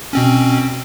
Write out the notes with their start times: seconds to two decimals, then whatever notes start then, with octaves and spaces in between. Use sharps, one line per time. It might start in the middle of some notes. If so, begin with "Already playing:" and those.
0.13 B2 C4 C#4